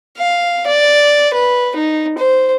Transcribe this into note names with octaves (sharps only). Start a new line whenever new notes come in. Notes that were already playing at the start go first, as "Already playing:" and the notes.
F5
D5
B4
D#4
C5